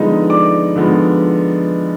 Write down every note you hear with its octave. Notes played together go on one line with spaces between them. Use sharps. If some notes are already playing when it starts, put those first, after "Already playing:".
Already playing: D3 F3 G#3 B3 D#4 D#5
D5 D6
D3 F3 G#3 B3